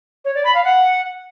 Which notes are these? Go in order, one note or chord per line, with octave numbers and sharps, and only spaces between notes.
C#5
D5
B5
F5
F#5